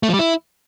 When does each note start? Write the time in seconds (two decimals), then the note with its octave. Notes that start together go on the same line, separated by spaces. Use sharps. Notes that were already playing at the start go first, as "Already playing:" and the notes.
0.03 A3
0.08 F3
0.14 G3
0.19 E4